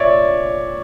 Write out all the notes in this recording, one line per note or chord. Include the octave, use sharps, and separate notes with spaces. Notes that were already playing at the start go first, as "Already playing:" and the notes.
Already playing: A#2 C#5 D5 E5